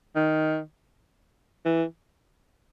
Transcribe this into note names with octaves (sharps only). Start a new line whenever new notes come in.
D#3
E3